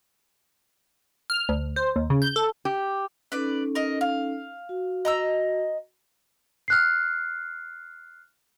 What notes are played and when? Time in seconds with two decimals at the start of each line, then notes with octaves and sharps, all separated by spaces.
1.30 F6
1.49 D2
1.76 C5
1.96 D#2
2.10 C#3
2.22 G6
2.36 A4
2.65 G4
3.32 C#4 D#4 A4 B4 D5
3.75 A#4 D#5
4.01 F5
4.69 F#4
5.05 D#5 A#5 E6
6.68 F6 F#6 C7